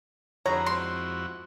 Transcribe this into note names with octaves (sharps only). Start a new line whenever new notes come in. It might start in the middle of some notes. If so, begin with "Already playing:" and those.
F2 D3 E4 F#4 G#4 B4 C#5 A#5
G#3 C4 C6